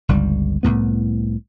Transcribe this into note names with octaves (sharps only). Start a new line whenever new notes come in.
G1 C#2 G3
C2 F2 A2 B3